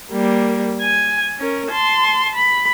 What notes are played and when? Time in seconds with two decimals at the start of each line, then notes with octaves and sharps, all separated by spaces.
0.11 G3 A#3
0.82 G#5
1.39 C#4 A#4
1.71 A5 C6
2.36 B5